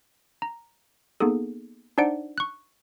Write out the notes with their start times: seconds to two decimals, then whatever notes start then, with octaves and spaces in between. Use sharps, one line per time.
0.42 A#5
1.20 A#3 B3 D#4 G#4 A4
1.98 D4 D#4 C5 D5 F#5 D7
2.38 C#6 F#6